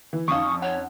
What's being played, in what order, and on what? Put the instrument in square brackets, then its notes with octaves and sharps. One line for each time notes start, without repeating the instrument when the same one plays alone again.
[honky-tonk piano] E3
[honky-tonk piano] F2 C#4 D#4 [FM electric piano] F5 C#6 [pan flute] D#6
[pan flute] C#5 [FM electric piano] F#5